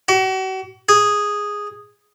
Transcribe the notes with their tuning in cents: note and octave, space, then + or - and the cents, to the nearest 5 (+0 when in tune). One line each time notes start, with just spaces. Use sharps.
F#4 +40
G#4 -5